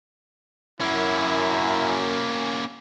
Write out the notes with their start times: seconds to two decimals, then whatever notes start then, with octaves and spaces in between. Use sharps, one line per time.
0.81 F#2 A#3 C#4 E4